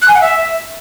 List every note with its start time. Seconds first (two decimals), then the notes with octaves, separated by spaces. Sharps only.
0.02 F#6
0.08 G#5
0.15 F#5
0.21 E5